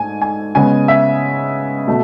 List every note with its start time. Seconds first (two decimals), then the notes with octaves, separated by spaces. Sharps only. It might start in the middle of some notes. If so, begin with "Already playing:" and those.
Already playing: G#2 A3 G#5
0.22 G#5
0.55 C#3 G#3 B3 G#5
0.88 E5
1.87 B2 A3